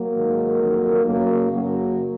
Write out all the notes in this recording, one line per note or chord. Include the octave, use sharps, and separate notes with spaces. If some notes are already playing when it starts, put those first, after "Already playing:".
Already playing: F#3 A#3
G#2 D#3
F2 D#3
F#2 C#3 F#3 A#3
F#2 C#3 F#3 A#3